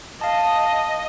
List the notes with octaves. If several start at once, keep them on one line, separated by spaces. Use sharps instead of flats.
D#5 F5 A5